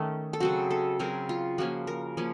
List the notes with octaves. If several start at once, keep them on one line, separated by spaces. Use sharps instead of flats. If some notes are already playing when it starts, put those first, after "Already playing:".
Already playing: D#3 A3 C#4
A4
C#3 F#3 C4 F#4
A4
C#3 F#3 C4 A#4
F4
F3 A#3 C#4 F#4
A#4
F3 A#3 C#4